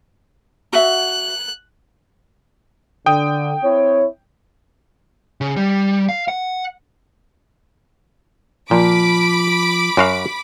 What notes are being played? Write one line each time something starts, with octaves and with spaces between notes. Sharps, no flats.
F#4 E5 F#5 F#6
D3 G5 D#6
C4 E4 C#5
C#3
G3
F5
F#5
A#2 F3 B5 D6
F#2 F#4 F5